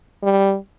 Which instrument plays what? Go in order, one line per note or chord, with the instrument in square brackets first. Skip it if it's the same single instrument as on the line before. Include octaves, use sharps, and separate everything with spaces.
[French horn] G3